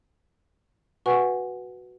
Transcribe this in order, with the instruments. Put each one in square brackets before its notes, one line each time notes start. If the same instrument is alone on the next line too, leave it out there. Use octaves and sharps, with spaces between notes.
[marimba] F#4 B4 F#5 G#5 C#6